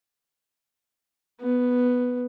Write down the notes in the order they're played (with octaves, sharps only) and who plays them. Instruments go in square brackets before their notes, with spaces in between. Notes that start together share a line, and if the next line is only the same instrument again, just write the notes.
[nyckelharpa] B3